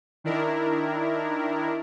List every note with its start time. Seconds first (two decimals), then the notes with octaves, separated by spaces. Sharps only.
0.24 D#3 D4 E4 A#4